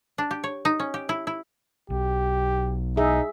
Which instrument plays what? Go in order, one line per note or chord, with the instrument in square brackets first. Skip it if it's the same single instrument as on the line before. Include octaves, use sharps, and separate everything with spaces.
[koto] D4
G4
C#5
D#4
C#4
G4
E4
E4
[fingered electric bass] B1 [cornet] G4
[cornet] D#4 [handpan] G#4 E5